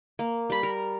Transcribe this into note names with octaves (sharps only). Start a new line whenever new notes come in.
A#3
G3 B5
A#4